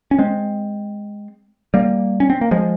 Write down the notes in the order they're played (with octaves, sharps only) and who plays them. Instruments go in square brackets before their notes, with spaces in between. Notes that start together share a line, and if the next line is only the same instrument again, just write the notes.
[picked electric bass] C#4
G#3 C4
G3 A#3
C#4
C4
A#3
F3 G#3